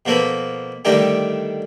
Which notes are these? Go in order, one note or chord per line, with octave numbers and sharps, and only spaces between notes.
B2 F3 A#3 A4 B4
D3 D#3 G3 A3 D#4 G4